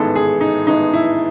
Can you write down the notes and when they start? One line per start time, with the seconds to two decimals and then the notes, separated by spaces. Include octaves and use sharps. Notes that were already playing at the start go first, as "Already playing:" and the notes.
Already playing: A1 G#2 D#3 G#3 B3 A4
0.15 G#4
0.41 D#4
0.67 A1 G#2 D#3 G#3 B3 D#4
0.93 E4